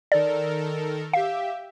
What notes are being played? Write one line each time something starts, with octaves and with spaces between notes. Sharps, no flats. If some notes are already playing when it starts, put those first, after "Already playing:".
D#3 A4 A#4 D5
G4 E5 F5